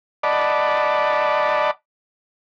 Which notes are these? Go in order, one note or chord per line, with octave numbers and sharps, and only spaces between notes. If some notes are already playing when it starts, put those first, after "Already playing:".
D5 D#5 F#5 A5 B5 D6